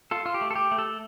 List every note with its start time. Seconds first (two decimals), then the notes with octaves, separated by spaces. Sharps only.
0.11 F4 A4
0.26 F4
0.34 G4
0.41 A3
0.51 A4
0.56 G4
0.71 A3
0.79 A4